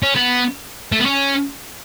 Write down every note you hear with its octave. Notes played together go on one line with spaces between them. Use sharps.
C#4
B3
A3
B3
C#4